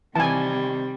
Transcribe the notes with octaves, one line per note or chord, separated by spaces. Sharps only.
C3 D#3 E3 G3 G#5 A5